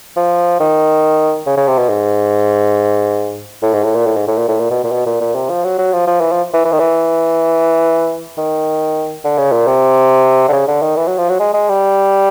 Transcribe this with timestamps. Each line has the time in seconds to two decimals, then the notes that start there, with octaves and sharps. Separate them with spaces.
0.16 F3
0.60 D#3
1.46 C#3
1.57 C#3
1.68 C3
1.78 B2
1.89 G#2
3.62 A2
3.74 G#2
3.84 A2
3.95 A#2
4.06 A2
4.16 G#2
4.28 A2
4.37 A#2
4.48 A2
4.60 A#2
4.70 B2
4.84 A#2
4.92 B2
5.06 A#2
5.20 A#2
5.35 C3
5.49 F3
5.64 F#3
5.78 F#3
5.93 F3
6.07 F3
6.21 E3
6.32 F3
6.54 E3
6.65 E3
6.72 D#3
6.80 E3
8.38 D#3
9.24 D3
9.38 C#3
9.52 A#2
9.67 C3
10.48 D3
10.53 C#3
10.67 D3
10.82 D#3
10.96 E3
11.07 F#3
11.18 F3
11.29 F#3
11.39 G#3
11.53 G#3
11.69 G3